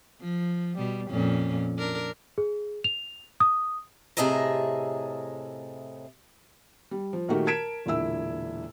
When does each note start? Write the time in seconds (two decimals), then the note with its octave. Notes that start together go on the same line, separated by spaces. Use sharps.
0.21 F3
0.77 B2 G3
1.10 F2 A#2 C#4
1.78 D4 A#4
2.38 G#4
2.84 F7
3.40 D#6
4.17 A2 C3 G#4 D#5 E5 A#5
6.91 G3
7.13 F3
7.28 A#2 D#3 A3 F#4 G4 A#4
7.46 A#4 A5 G#6 B6 D7 E7
7.86 E1 A#2 D3 E4 E6